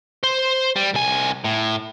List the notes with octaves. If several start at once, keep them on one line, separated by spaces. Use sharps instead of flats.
C5
G3
C2 G#5
A2